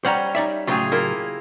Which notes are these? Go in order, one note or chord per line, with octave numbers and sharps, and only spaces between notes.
G3 C#4 G4 C5 F#5 A#5
D#4 D5 E5
A2 C#3 F#3 F4 G4 G#4
A#3 E4 F4